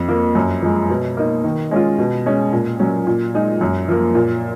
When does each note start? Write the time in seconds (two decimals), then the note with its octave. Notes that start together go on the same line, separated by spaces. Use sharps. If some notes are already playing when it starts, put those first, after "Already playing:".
Already playing: F2
0.08 F3 A#3
0.35 F#2
0.62 F3 G#3
0.90 B2
1.17 A#3 D#4
1.44 D#3
1.71 G#3 C#4 F4
1.98 B2
2.26 G#3 C#4
2.52 A#2
2.79 F#3 C#4
3.07 A#2
3.34 G#3 D#4
3.61 F#2
3.88 F3 A#3
4.15 A#2